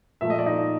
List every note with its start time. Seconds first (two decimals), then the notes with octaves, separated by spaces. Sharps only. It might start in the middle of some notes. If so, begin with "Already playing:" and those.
0.21 A#2 F3 A3 E5
0.30 D#5
0.39 D5
0.46 D#4 D#5